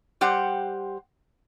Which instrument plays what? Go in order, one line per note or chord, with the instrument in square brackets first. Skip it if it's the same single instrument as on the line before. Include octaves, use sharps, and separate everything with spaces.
[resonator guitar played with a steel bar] G3 G4 C5 F#5